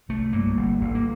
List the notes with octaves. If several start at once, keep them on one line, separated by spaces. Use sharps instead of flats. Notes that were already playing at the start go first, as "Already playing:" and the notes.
C2 A3
G2 A#3
G1
G1
A#3